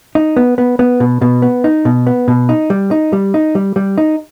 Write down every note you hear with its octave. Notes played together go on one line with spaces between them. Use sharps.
D#4
B3
B3
B3
B2
B2
B3
D#4
B2
B3
B2
D#4
G3
D#4
G3
D#4
G3
G3
D#4